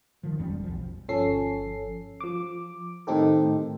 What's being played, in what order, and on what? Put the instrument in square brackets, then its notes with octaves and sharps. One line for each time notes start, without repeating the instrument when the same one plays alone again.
[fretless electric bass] D#3 F3
F#1 F2 G3 C#4
E1
B1 F3
[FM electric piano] G1 F3 C#4 A4 C7
F3 D6
A2 D#3 C4 D#4 G4 A4